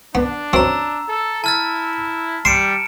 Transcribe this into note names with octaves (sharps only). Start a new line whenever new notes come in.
B3 D4
F#2 C4 A#5 E6
A4
E4 A5 F6 A6
G3 C6 C#7 D7 E7